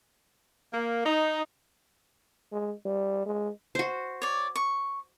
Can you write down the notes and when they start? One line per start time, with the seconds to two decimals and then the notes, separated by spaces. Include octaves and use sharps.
0.73 A#3
1.04 D#4
2.52 G#3
2.86 G3
3.26 G#3
3.75 F#4 C5
4.22 C#5 D5
4.56 C#6